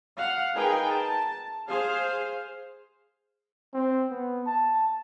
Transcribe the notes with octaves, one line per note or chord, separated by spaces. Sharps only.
F5 F#5
D#4 G#4 A#4 B4 G5 G#5
A5
G#4 C5 F5
C4
B3
A5